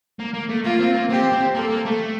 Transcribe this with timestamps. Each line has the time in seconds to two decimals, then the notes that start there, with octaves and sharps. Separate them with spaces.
0.20 A#3
0.34 A#3
0.49 A3
0.64 A#3 F4
0.80 C4
0.95 A#3
1.10 C4 G4
1.33 C4
1.55 A#3 A4
1.70 A#3
1.85 A3